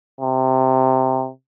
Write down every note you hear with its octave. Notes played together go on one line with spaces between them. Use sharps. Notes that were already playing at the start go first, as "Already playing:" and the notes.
C3